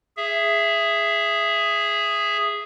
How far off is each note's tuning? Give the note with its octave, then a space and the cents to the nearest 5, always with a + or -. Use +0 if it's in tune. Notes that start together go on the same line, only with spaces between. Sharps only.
G#4 -5 E5 +15